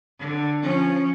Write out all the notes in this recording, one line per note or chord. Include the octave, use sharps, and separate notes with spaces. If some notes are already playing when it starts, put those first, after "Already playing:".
D3
F3 C#4